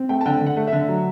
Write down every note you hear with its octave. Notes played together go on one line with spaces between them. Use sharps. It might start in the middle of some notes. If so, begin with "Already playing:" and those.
Already playing: C4
A3 G5
A5
D3 G5
D3
F#5
A3
D3 E5
F#3